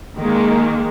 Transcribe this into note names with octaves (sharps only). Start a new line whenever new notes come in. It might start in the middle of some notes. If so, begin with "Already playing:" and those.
D#3 G#3 A#3